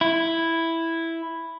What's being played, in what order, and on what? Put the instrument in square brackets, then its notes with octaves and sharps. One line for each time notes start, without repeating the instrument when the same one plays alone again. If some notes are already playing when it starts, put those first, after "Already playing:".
[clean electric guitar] E4